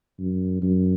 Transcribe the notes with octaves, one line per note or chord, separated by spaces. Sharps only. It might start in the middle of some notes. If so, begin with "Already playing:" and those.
F#2
F#2